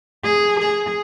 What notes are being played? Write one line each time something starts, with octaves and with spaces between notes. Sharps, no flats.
G#4
G#4